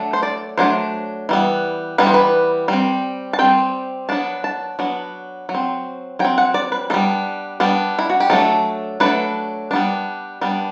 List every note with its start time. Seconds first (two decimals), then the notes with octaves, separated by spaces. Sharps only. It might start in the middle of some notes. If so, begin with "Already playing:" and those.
Already playing: F#3 A3 D4
0.13 C5
0.23 D5
0.58 F#3 A3 D4 C5
1.29 E3 G3 B3
1.98 E3 G3 B3 B4
2.07 C5
2.14 B4
2.68 G3 C4
3.33 A5
3.39 G3 C4 G5
4.09 F#3 B3 D4 A5
4.44 A5
4.79 F#3 B3 D4
5.49 F#3
5.54 C4
6.19 F#3 G5
6.25 C4
6.38 F#5
6.54 D5
6.72 B4
6.90 G3 B3 D4 A4
7.60 G3 B3 D4
7.99 E4
8.10 F#4
8.20 G4
8.30 F#3 A3 D4 A4
9.00 F#3 A3 D4 B4
9.71 G3 B3 D4
10.41 G3 B3 D4